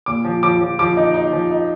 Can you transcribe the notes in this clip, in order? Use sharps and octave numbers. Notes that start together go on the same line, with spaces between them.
A#2 D6
F3
F3 D6
F3
F3 D6
D#4
D#4
F3
D#4